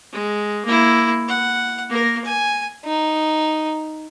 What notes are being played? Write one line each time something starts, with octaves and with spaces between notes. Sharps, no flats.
G#3
A#3 E4
F#5
A#3 A#4
G#5
D#4